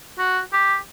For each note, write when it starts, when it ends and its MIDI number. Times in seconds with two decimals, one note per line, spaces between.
0.18 0.40 66
0.53 0.76 67